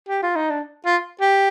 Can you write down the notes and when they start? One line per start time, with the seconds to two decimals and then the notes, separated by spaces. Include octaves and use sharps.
0.09 G4
0.22 F4
0.36 D#4
0.50 D4
0.86 F4
1.21 G4